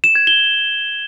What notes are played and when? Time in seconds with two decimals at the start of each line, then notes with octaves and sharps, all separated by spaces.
0.04 E7
0.15 G#6
0.27 G7